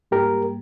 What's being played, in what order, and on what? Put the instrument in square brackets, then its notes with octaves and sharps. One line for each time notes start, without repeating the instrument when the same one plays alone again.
[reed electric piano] G#2 G3 A#3 G4 A#4